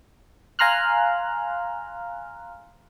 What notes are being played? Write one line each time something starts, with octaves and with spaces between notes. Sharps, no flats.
F5 G#5 A#5 C6 F6 F#6